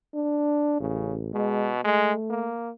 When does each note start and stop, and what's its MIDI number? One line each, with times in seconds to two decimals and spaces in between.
0.14 0.77 62
0.80 1.31 33
0.80 1.16 49
1.34 1.82 47
1.34 1.73 56
1.84 2.13 56
1.84 2.52 57
2.30 2.71 58